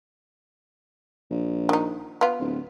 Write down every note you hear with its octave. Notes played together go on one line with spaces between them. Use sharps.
A#1
D#3 D#4
B3 F4
D1